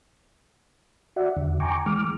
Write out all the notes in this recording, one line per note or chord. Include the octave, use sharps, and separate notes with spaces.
F#4 D5 E5 F#5
E2 D3
G5 G#5 A#5 C#6 D6
E3 G#3 D6 F6